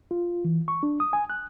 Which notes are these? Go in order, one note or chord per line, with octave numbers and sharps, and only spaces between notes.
F4
E3
C#6
D4
D#6
G#5
F#6